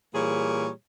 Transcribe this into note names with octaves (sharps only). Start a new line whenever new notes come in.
A#2 E3 G3 A#3 G#4 C#5